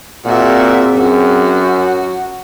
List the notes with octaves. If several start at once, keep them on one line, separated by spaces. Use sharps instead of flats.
A#2 C4 F#4 G#4 E5
F#2 F#4